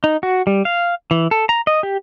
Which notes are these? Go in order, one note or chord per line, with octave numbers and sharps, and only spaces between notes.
D#4
F#4
G3
F5
E3
A4
A#5
D#5
G4